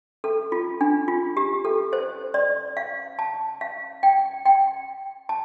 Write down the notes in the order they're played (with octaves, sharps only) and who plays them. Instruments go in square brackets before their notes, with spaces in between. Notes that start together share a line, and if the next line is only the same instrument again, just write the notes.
[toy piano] A4
F4
D4
F4
G4
A4
C5
D5
F5
A5
F5
G5
G5
A5